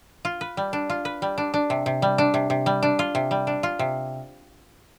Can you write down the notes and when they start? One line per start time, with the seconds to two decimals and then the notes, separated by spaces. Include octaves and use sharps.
0.25 F4
0.41 B4
0.57 G3
0.73 D4
0.90 F4
1.05 B4
1.22 G3
1.38 D4
1.54 D4
1.70 C3
1.86 C3
2.02 G3
2.18 D4
2.34 C3
2.50 C3
2.66 G3
2.83 D4
2.99 F4
3.15 C3
3.31 G3
3.47 D4
3.63 F4
3.79 C3